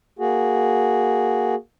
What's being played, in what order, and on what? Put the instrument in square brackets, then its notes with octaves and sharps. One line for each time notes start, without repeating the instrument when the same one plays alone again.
[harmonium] A#3 F#4 G#4